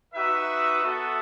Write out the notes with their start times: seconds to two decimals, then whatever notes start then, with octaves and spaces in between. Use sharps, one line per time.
0.14 D#4 F#4 B4 E5
0.83 B3 F#4 A4 E5